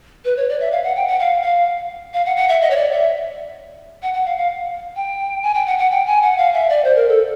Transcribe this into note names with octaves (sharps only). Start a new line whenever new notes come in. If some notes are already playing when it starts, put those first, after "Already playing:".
B4
C#5
D5
E5
F5
F#5
G5
F#5
F5
F5
F5
F#5
F#5
E5
D#5
C#5
D5
E5
F#5
F#5
F5
F5
G5
G#5
G5
F#5
F#5
G5
G#5
F#5
F5
E5
D5
C5
A#4
A4